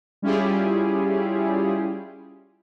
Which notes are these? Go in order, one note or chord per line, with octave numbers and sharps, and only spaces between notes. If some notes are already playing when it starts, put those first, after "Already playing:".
G3 C#4 E4 F4 G4 G#4